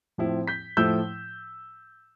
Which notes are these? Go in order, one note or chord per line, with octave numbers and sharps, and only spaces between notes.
A2 F3 C4 E4
G6 B6
A2 F3 A3 E4 E6 G6